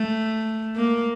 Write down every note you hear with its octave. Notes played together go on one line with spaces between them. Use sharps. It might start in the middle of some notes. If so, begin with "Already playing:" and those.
Already playing: A3
A#3